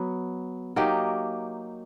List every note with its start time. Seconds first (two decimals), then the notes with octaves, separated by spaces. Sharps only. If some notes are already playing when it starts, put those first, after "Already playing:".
Already playing: F#3 B3
0.76 F#3 A#3 D#4 G4